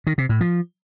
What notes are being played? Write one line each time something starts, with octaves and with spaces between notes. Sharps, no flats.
D#3
C3
A2
F3